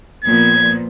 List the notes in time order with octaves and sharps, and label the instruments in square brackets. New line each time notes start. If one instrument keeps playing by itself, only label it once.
[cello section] A#2 F3 B3 [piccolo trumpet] G#6